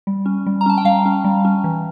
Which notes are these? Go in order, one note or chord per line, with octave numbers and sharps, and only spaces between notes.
G3
C#4
G3
A#5
C#4 A5
G5
G3 F5
C#4
G3
C#4
E3